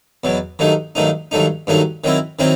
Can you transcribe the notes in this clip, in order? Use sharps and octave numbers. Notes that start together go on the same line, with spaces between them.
E2 B2 F#3
G2 D#3 F#3 A3 D#4
G2 D#3 F#3 A3 D#4
G2 D#3 F#3 A3 D#4
G2 D#3 F#3 A3 D#4
D#3 F#3 C4 E4
D#3 F#3 C4 E4